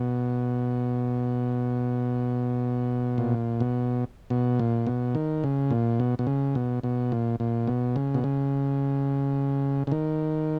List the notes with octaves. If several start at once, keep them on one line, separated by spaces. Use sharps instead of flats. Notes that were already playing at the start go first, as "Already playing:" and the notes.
Already playing: B2
A#2
B2
B2
A#2
B2
D#3
C#3
A#2
B2
B2
C#3
B2
B2
A#2
A#2
B2
C#3
B2
C#3
C#3
D#3